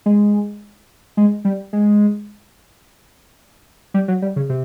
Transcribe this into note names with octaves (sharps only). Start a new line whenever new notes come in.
G#3
G#3
G3
G#3
G3
F#3
G3
C#3
C3